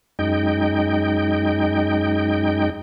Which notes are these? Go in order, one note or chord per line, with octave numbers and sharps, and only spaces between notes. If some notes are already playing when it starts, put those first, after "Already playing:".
F#2 G#3 D#4 G5